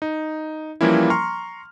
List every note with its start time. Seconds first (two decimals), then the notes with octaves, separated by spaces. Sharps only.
0.02 D#4
0.81 E3 F3 G3 A#3 C#4 E4
1.10 A#5 C6 C#6 F6